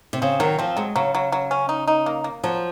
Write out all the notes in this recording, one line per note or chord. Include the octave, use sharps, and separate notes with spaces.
C3
C#3 C4
D#3 F#3
F3 C4
F#3 G#3
C#3 F#3
F#3
F#3
C#4
D#4
D#4
A#3
A#3
F3 F#3